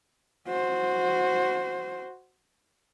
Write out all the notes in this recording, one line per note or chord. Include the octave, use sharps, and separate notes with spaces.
F#4 C5